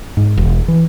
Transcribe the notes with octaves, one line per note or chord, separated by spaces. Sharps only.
G#2
E1
E3